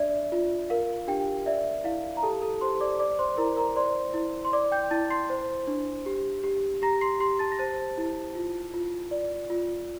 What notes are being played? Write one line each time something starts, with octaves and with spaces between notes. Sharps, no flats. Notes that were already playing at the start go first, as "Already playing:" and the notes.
Already playing: D4 D5 E5
F4
A#4 F5
D4 G4 G5
D5 E5
E4 F5
A#5
G4 A4 A5
A4 A5
G4 C5 C6
D5 D6
D5 D6
C5 C6
E4 A#4 A#5
A#4 A#5
C5 D5 C6
E4
C6
D5 D6
G5 G6
E4 A5 A6
C6 C7
C5
D4
G4
G4
G4 A#5 A#6
C6 C7
G4 C6 C7
A5 A6
A#6
C5 A5 A6
E4
F4
F4
D5
F4